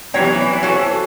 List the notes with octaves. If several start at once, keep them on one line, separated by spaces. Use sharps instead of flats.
F#2 C3 E3 B3 C#5 G5 A#5
C#4 F#4 A4 C5 G#5 C#6